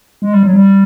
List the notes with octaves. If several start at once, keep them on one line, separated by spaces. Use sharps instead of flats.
G#3
G3
F#3
G3